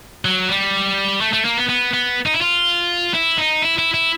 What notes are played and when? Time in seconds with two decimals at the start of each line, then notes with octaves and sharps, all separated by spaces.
0.25 F#3
0.49 G3
1.21 A3
1.33 A3
1.45 A#3
1.57 B3
1.69 B3
1.93 B3
2.26 D#4
2.34 E4
2.41 F4
3.14 E4
3.38 D#4
3.62 E4
3.78 E4
3.94 E4